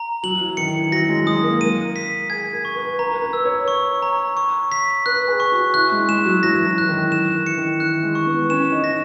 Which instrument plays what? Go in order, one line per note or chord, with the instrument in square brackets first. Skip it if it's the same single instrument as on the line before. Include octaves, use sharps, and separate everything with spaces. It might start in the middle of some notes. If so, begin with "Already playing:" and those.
Already playing: [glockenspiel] A#5
[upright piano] F#3 [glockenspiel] F#7
[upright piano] E3
[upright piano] D#3 [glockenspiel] C#7
[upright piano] E3
[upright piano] F#3 [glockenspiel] A#6
[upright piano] G#3
[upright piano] G#3 [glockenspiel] D#6
[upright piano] A#3
[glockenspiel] D#7
B6
[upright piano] G#4 [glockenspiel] G#6
[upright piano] A#4
[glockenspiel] C#6
[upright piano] B4
[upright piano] B4 [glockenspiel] A#5
[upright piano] A#4
B4
[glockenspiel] E6
[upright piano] C#5
[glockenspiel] C#6
A#5
C#6
B6
[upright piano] B4 [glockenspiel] F#6
[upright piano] G#4
[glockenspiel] C#6
[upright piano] F#4
[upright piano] E4 [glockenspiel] F#6
[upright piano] G#3
[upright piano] G#3 [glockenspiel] E7
[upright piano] F#3
[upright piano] E3 [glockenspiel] A#6
[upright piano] E3
[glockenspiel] F#6
[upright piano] D#3
[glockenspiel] E7
[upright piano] E3
[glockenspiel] C#7
[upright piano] D#3
[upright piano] E3 [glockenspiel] F#6
[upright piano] G#3
[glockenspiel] C#6
[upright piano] B3
[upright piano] C#4 [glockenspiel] E7
[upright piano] D#4
[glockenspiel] A#6